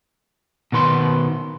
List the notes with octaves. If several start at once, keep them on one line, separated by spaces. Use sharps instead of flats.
B2 D#3 B4 C6